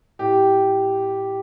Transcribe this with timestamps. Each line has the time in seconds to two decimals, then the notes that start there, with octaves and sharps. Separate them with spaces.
0.19 A2 G4